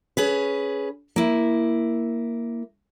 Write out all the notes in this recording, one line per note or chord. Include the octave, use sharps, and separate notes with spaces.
C#4 G#4 B4
A#3 E4